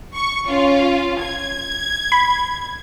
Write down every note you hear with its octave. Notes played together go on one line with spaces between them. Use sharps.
C#6
C#4 F4
G#6
B5